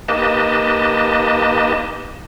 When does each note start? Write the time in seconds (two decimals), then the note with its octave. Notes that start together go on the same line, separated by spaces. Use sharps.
0.08 A#3 D#4 G4 B4 D#5 A5